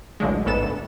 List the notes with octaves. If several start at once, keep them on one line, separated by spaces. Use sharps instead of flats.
A1 D2 A#2 D3 F#3 G#3
A1 G#2 B3 A4 E7
D2